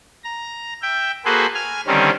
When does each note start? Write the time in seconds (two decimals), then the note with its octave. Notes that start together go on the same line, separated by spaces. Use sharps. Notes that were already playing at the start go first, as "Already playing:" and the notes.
0.24 A#5
0.82 E5 G5
1.25 A#3 F#4 G#4 A4 B4 C5
1.55 G#5 F6
1.87 D3 D#3 G3 C4 C#4 D#4